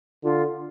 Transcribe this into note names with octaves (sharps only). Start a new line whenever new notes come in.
D3 F4